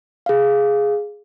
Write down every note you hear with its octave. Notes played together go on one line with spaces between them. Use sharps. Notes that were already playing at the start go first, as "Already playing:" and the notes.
G#4 F5